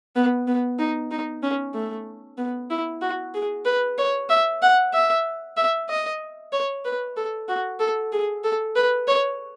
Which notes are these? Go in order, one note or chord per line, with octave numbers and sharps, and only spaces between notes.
B3
B3
D#4
D#4
C#4
A3
B3
E4
F#4
G#4
B4
C#5
E5
F#5
E5
E5
D#5
C#5
B4
A4
F#4
A4
G#4
A4
B4
C#5